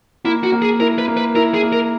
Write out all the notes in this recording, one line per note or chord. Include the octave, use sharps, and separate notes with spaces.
A#3 E4
F#4
A#3
G#4
E4 A#4
B4
A#3
B4
E4 A#4
G#4
A#3
A#4